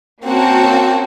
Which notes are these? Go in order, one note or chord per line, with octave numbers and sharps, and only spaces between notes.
A#3 C4 C#4 F#4 G5 A5